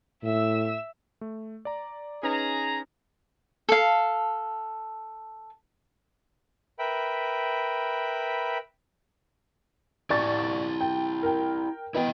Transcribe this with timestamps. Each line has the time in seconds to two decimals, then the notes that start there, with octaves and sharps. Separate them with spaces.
0.23 A2 E5 E6
1.21 A3
1.65 D5 A#5
2.23 C#4 D#4 G#4 B4 A#5
3.69 A4 F5
6.79 A#4 B4 E5 G5 B5
10.10 E4 G4 D5 G#5 C#6 A6
10.80 G5
11.23 A#4 G5
11.94 B3 E4 D#5 G5